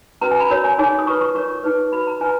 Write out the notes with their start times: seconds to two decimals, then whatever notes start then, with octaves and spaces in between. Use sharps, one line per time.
0.21 C#4 F#4 B4 A#5
0.31 G#5
0.40 B5
0.50 F#4 A#4 C#5
0.64 G#5
0.78 D#4 G#4 C#5 G#5
0.99 D#6
1.07 F4 B4 C#6
1.21 C#6
1.35 F4 A#4 C#5 C#6
1.64 D#4 G#4 B4
1.92 F#4 B4 B5
2.07 A#5
2.21 F4 B4 G#5